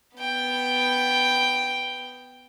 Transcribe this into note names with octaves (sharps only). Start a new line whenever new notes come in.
B3 G5